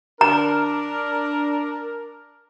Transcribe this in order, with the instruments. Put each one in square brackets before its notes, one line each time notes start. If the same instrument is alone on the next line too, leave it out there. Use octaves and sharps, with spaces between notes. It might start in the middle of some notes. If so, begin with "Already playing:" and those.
[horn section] D4 A#4 [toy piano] A#5